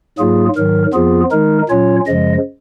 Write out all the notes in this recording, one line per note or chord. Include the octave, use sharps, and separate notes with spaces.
G#2 F#3 A#3 F4 G#4
G#2 D#3 F#3 A#4
F2 F3 B3 F4 G#4
D#3 G#3 D#4 A#4
A#2 F#3 C#4 F4 C#5
F#2 C#3 F3 G#3 D#5